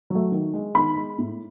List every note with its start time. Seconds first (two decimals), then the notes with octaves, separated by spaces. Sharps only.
0.10 F#3 A3
0.32 D#3
0.54 G#3
0.75 D#3 B5
0.96 G#3
1.18 A2